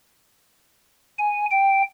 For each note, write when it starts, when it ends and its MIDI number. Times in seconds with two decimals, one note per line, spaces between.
1.19 1.46 80
1.51 1.82 79